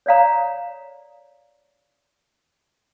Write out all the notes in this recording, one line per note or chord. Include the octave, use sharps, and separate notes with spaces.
C#5 D5 F5 A#5